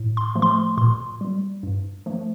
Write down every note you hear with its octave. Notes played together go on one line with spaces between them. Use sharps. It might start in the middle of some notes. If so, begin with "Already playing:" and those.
Already playing: A2
C6
F3 A3
C6
A#2 C6
G3
G2
F3 A3